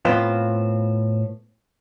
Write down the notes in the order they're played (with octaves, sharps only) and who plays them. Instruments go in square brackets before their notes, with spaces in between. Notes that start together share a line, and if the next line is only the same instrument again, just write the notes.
[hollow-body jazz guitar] A2 B3 C4 F4